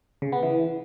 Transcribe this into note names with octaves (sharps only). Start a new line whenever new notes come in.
C#3
B3
E3